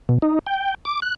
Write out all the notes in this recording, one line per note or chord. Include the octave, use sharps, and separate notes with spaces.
B2
D#4
G5
D6
F#6